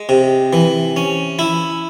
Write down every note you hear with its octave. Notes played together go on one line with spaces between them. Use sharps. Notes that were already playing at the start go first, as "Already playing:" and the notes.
Already playing: G#3
C3
E3
C#4
E4